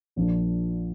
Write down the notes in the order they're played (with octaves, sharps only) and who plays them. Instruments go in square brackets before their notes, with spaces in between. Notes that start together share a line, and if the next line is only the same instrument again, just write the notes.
[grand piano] A#1 A#2 F3 A#3 D4